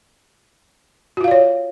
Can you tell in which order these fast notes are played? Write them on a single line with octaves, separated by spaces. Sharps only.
F#4 F4 F5 D5 C#5